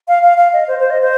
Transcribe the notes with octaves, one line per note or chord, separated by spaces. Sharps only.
F5
F5
F5
D#5
C5
C5
D#5
C5